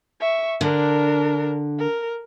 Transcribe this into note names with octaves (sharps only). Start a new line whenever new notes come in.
E5 C#6
D3 D4 A#4
A#4